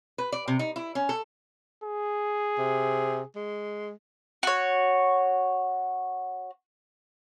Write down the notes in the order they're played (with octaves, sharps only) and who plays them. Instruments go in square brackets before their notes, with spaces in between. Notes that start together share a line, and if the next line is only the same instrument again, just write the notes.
[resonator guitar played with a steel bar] B4
D5
C3
D#4
E4
C#4
A4
[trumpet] G#4
[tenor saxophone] C3
G#3
[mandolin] F#4 C#5